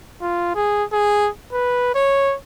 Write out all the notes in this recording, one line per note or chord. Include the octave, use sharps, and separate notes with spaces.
F4
G#4
G#4
B4
C#5